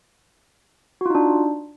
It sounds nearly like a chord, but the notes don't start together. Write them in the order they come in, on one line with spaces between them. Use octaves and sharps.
F#4 F4 D#4 D4